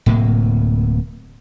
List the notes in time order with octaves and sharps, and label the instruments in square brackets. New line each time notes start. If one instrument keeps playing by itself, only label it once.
[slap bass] D1 A2 C3 A#3